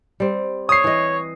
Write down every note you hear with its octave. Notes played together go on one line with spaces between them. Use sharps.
G3 C4
C#5 D#6 C7
E3 D#5